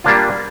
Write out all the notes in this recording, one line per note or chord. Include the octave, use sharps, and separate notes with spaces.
G3 A#3 D4 F4